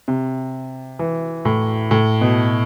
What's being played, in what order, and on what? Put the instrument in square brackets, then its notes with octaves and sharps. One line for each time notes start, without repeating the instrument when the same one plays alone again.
[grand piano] C3
E3
A2
A2
B2